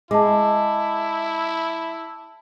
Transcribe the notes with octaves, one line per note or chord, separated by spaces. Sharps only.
G#3 E4 A5 D6